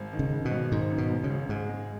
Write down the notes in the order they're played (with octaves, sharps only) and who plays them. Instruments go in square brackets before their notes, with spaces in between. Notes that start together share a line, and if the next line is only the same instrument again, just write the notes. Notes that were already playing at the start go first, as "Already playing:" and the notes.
Already playing: [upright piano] G#1
D#3
[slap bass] C#3
[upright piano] G#1
[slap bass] B2
[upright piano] G#1
[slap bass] G#2 [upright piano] D#3
[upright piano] F#2
[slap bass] B2
[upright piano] G#1
[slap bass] C#3
[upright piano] G#1
[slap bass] G#2 [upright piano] G#4
[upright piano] G#3